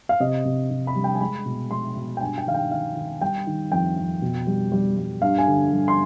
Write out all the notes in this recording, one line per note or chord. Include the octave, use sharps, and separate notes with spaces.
F5
C3 D#5
C3
C3
B5
G3
G5
G#5
G#3 B5
B2
G#3 C6
B2
G5
G2 G#5
G5
D#3 F5
G5
D#3 F5
D#3
G3 G5
D#3
F2 G5
F2
B2
G3
G3
G3
G2 F5
G#5
D3
G3
C6